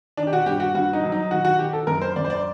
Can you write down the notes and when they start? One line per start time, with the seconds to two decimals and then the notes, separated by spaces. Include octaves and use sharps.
0.17 D#3 D4
0.27 G4
0.33 F#4
0.46 G2 G4
0.60 F#4
0.75 G2 F#4
0.93 D#4
1.03 F#3
1.12 D#4
1.31 D#3 F#4
1.45 F#4
1.59 D#3 G4
1.73 A4
1.87 F#2 A#4
2.02 C5
2.16 F#2 D5
2.24 C5
2.30 D5